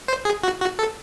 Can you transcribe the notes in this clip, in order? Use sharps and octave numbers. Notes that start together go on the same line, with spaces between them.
C5
G#4
F#4
F#4
A4